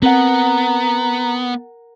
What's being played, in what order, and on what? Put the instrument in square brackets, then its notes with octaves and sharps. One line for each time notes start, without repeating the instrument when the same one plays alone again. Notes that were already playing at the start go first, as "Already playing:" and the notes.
[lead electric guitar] B3 [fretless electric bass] C4 [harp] A#4 F#5 [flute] A#5